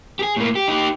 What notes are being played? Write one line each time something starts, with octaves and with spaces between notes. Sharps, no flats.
G4 G#4
A2 A#3
G4
D#4 G4